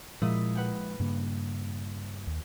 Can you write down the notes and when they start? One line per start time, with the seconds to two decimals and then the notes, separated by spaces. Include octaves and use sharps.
0.22 A#2 F3 G#3 E4 D#6
0.55 B4 F#5 G5
1.00 G2 C#3 A#3
2.27 D#2